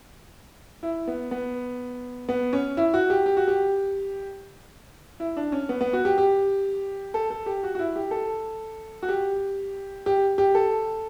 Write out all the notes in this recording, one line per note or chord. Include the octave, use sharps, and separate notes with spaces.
E4
B3
B3
B3
C#4
E4
F#4
G4
G4
F#4
G4
E4
D4
C#4
B3
B3
F#4
G4
G4
A4
A4
G4
F#4
F#4
E4
G4
A4
F#4
G4
G4
G4
A4